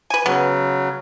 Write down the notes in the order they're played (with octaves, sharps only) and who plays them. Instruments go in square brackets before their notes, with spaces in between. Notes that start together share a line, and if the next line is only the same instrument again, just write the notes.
[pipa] B4 G#5
[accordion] C#3 F#3 [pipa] B3